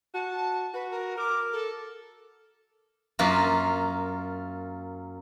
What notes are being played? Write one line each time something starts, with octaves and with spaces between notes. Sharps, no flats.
F#4 A5
F#4 B4
A#4
A#4 D6
A4
F#2 A#3 F4